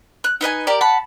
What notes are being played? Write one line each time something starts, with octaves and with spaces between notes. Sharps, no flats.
F#6
D#4 B4 D#5 G#5
G4 A#4 D5
F#5 A5 B5